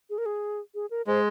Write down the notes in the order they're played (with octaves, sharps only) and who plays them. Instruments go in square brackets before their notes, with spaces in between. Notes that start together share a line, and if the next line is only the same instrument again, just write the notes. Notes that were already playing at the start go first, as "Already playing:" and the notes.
[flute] G#4
A#4
G#4
G#4
A#4
[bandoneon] G#3 [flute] C5